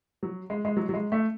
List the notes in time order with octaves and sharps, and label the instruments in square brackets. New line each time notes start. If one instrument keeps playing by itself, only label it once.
[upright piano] F#3
G#3
G#3
F#3
F#3
G#3
A3